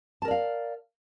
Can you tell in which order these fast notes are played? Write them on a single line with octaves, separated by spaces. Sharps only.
A5 A#4 D5 F5